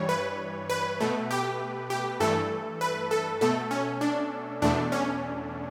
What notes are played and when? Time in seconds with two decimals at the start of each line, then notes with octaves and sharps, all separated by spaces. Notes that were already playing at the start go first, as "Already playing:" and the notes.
Already playing: G2 E3 G3 C#5
0.09 B4
0.70 B4
1.00 B2 A3
1.31 G4
1.90 G4
2.20 G2 E3 A3 A4
2.81 B4
3.11 A4
3.41 B2 A3 A4
3.71 C#4
4.01 D4
4.62 E2 B2 A3 D4
4.92 C#4